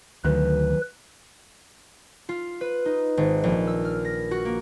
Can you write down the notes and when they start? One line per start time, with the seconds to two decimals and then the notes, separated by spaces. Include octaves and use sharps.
0.24 D2 D#3 F#3 B4
2.29 F4
2.61 B4
2.85 D#4
3.17 G#1
3.43 A#1
3.67 E6
3.85 F6
4.04 A#6
4.31 F#4
4.45 A#3